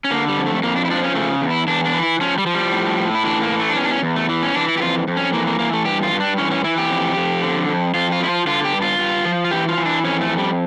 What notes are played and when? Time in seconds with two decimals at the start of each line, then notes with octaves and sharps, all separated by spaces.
0.04 C#4
0.11 D3 A#3
0.28 G3
0.37 F2
0.46 A3
0.63 F2 A#3
0.76 D4
0.85 E4
0.90 F3 D4
1.03 C#4
1.15 C#3 A3
1.41 E2
1.50 E4
1.67 E2 D4
1.86 D4
1.94 E3
2.03 E4
2.21 F3 C#4
2.38 G3
2.46 F3
2.55 G3
2.72 A2
2.98 A2
3.15 E4
3.25 E3 D4
3.42 A#3
3.51 E3
3.60 A3
3.69 D4
3.76 E2 C#4
3.85 D4
3.91 C#4
4.03 E2
4.16 A3
4.29 E3
4.43 C#4
4.55 E3 D4
4.68 E4
4.77 G4
4.81 F2 F4
5.08 F2
5.17 C#4
5.33 E3 A#3
5.47 A#3
5.59 E3 A#3
5.73 A3
5.85 G2 G4
6.03 F4
6.12 G2
6.20 D4
6.38 E3 C#4
6.51 C#4
6.64 E3 E4
6.78 G4
6.90 F2
7.17 F2
7.42 D3
7.68 F2
7.94 F2 F4
8.12 F4
8.20 F3 E4
8.29 F4
8.47 D3 F4
8.65 G4
8.73 G2
8.82 F4
8.99 G2
9.25 F3
9.45 F4
9.51 E3 G4
9.69 F4
9.78 E3
9.86 D4
10.04 F2 C#4
10.21 A3
10.29 F2
10.38 G3